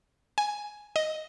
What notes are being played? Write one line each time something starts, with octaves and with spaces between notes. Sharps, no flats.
G#5
D#5